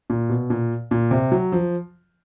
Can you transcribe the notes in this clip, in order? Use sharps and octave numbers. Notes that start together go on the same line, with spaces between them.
A#2
B2
A#2
A#2
C3
F#3
F3